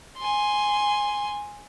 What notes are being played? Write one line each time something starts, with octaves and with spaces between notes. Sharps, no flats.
G#5 C6